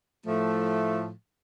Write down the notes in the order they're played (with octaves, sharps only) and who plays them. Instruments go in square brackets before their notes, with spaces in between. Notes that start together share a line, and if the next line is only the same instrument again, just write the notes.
[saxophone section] A2 F3 A3